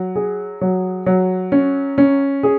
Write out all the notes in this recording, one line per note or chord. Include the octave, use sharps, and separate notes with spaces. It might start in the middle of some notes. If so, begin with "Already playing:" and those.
Already playing: F#3
G#4
F#3
F#3
C#4
C#4
G#4